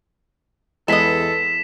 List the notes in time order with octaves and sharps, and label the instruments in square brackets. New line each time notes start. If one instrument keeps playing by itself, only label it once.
[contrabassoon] E2 [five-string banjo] G#3 B4 D#5 [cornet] A4 [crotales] B6 E7